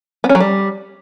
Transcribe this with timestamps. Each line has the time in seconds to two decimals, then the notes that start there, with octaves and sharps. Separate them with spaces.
0.24 B3
0.29 C#4
0.35 F#3
0.40 G3